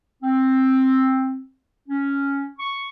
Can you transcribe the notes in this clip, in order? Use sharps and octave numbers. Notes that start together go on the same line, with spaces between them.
C4
C#4
C#6